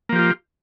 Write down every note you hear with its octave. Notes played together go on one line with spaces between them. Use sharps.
F3 A#3 F4 G4